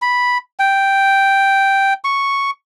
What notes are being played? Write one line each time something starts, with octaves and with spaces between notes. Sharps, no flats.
B5
G5
C#6